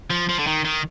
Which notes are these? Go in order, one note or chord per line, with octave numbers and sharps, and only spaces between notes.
F3
F3
D3
D#3
D#3